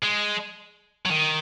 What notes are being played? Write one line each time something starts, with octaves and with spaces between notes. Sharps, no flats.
G#3
F#3
D#3